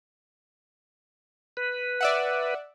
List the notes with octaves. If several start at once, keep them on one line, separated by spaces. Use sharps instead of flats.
B4
D5 E5 F#5